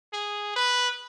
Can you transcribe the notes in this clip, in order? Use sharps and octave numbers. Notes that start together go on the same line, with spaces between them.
G#4
B4